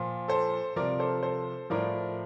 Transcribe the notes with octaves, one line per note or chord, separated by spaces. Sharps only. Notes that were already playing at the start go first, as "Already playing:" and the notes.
Already playing: A#2 F3
A4 C5
C3 F3 A#4 D5
A4 C5
A4 C5
A2 F3 A#4 D5